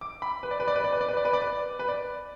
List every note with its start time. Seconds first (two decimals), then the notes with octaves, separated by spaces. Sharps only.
0.01 D6
0.22 B5
0.43 B4
0.51 D5
0.60 B4
0.68 D5
0.75 B4
0.84 D5
0.92 B4
1.01 D5
1.09 B4
1.17 D5
1.25 B4
1.33 D5
1.42 B4
1.79 B4
1.89 D5